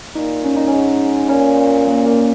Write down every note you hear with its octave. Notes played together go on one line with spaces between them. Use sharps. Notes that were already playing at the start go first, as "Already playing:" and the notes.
A#2 D#4
C#4
D#4
G#2 C#4
A#2 C#4
A#3
A#3